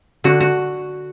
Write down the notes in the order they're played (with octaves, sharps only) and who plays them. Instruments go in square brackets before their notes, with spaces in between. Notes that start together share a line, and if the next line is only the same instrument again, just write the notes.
[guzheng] D3 F#4
F#4